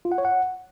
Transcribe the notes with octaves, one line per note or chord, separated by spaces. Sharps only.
F4
F#5
C#5
F#5